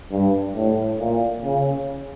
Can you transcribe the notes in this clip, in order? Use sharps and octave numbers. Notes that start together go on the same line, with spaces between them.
G2
A2
A#2
C#3